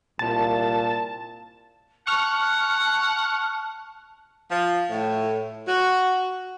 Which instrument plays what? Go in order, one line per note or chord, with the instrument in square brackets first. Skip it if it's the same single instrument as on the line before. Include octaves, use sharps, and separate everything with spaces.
[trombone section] C2 A#2 [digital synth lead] A5
[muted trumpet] F#5 [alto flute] A5 [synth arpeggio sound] C#6 F6
[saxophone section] F3
A2
F#4